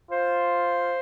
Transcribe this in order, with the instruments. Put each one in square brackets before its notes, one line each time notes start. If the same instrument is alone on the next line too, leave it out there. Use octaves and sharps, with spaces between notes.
[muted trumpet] F4 [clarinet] C5